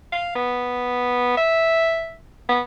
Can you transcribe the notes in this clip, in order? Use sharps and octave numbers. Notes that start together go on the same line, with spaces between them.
F5
B3
E5
B3